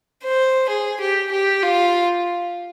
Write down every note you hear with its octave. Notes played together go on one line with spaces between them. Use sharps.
C5
G#4
G4
G4
F4